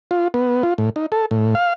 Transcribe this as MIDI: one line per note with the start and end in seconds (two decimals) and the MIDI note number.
0.11 0.28 65
0.34 0.63 59
0.63 0.74 65
0.78 0.90 45
0.96 1.06 63
1.12 1.26 69
1.31 1.55 45
1.55 1.73 77